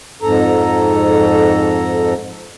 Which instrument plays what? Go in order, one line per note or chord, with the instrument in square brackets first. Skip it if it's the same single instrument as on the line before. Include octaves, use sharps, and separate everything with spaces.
[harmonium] F2 G#2 A4 A#5